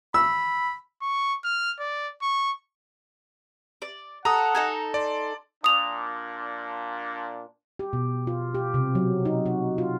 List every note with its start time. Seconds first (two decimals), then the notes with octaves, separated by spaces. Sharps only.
0.14 B5 E6
1.02 C#6
1.44 F6
1.80 D5
2.22 C#6
3.82 D5
4.25 A4 F#5 A#5 D#6
4.55 D#4 A4 G#5
4.94 D5 C6
5.64 A#2 D4 D#6 F7
7.79 G4
7.93 B2
8.27 F4
8.55 G4
8.74 C3
8.95 F#3
9.25 D#4
9.46 F#4
9.78 F4